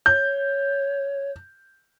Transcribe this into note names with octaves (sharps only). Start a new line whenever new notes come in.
C#5 G6